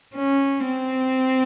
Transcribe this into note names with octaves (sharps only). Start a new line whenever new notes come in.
C#4
C4